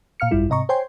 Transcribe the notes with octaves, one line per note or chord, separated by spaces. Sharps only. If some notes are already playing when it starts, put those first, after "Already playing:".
A#2 F5 F6 C#7
G#1 F#2 G3 E4 F4
G#2 C3 D#5 A#5 C#6
C5 C#5 G5 G#5 C6